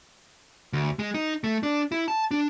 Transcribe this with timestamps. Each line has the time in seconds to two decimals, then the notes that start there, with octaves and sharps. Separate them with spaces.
0.73 D2
0.99 G#3
1.14 D#4
1.44 A3
1.63 D4
1.92 E4
2.08 A5
2.31 D4